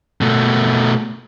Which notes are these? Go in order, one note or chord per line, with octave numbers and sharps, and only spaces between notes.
B2 A3